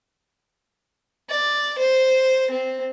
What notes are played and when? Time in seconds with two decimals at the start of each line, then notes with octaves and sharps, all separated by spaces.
1.30 D5
1.78 C5
2.51 C4